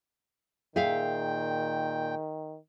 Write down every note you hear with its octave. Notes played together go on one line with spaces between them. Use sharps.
A#2 D#3 G#4 E5 F5 G5